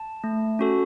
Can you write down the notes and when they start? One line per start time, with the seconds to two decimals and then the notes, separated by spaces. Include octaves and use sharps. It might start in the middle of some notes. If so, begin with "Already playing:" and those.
Already playing: A5
0.24 A3
0.59 C#4 F#4 A4